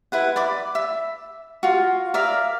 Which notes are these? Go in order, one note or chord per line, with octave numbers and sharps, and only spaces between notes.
E4 B4 F#5
D5 B5 D6
E5
F4 F#4
A#4 D5 E5 F5